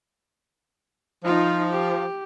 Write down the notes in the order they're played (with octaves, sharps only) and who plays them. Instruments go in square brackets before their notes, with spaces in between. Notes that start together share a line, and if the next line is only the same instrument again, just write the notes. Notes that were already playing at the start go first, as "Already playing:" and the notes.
[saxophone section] F3 [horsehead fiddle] D#4 F4
[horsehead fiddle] G4